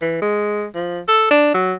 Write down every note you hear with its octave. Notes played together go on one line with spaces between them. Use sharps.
E3
G#3
F3
A4
D4
F#3